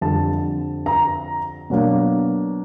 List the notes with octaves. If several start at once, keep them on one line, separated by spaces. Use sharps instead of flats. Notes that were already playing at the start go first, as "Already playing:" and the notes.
F2 D3 G3 A5
A#5
B2 F#3 A#3 D4